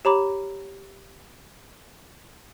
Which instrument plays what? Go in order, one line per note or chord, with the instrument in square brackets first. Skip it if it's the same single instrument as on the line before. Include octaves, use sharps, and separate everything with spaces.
[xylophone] G4 C#5 A#5 B5 D6